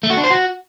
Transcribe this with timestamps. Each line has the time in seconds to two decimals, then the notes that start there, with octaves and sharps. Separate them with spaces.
0.03 A3
0.10 F#4
0.17 D4
0.24 C5
0.30 F#4